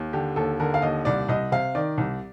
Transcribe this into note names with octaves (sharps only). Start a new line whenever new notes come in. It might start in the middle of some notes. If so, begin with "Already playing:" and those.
Already playing: D#2
D3 G4
D#2 A4
D3 A#4
F5
D#2 D#5
C2 D5
C2 D#5
C3 F5
D#3 D5
C2